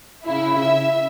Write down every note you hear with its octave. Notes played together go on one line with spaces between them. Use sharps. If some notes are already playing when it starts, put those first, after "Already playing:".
C#3 E4
E5